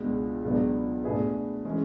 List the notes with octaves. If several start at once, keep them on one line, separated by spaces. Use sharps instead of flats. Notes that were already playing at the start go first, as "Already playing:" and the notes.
Already playing: C#2 B2 G#3 D4
C#2 B2 F#3 B3 D4
B2 A3 D4 G#4 B4
E3 G#3 C#4